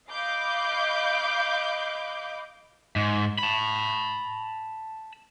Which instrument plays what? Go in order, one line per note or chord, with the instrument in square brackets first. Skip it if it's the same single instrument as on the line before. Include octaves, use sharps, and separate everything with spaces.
[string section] D#5 F5 B5 D6 G6
[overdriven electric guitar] G#2
A5 B5